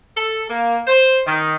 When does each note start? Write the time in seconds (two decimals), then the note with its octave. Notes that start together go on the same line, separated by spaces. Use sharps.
0.16 A4
0.49 A#3
0.87 C5
1.26 D#3